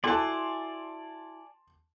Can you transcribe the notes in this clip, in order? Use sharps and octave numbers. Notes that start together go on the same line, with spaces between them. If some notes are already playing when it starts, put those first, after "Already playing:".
E4 F#4 A4 D5 G#5 A5 C6